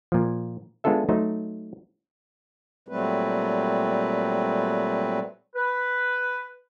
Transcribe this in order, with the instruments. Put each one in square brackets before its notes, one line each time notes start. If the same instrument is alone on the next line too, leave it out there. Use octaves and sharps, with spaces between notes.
[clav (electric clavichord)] A#2 F3
G#3 B3 D4 F4 A4 E5
F#3 A3 D#4 C5
[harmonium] A#2 F#3 G3 A3 C4 B4
[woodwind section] B4